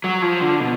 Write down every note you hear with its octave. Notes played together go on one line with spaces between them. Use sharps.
F#3
F3
D3
B2